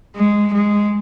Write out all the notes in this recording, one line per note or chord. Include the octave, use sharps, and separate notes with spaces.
G#3
G#3